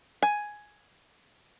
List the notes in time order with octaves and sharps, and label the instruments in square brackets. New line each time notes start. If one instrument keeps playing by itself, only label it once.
[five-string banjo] G#5